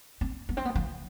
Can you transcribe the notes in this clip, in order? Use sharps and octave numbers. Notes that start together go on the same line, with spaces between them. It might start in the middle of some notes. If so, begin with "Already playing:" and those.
C4
B3
C4
B3
F3